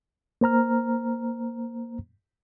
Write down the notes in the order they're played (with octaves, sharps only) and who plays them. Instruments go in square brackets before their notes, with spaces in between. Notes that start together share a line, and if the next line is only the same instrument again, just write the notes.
[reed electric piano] A#3 C5 A#5 F6